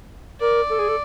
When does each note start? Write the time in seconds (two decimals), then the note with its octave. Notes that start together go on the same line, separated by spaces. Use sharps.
0.40 A#4 D5
0.70 A4
0.79 G#4
0.88 A4